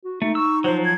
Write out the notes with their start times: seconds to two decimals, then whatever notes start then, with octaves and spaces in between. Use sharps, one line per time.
0.04 F#4
0.22 A3 D#4 E5
0.35 C#6 E6
0.64 F3 F#3 C5
0.85 G#6